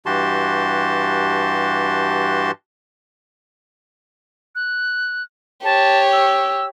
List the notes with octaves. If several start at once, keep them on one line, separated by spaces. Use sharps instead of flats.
G2 E3 F#4 G4 A5 C6
F#6
G4 C#5 A5
E6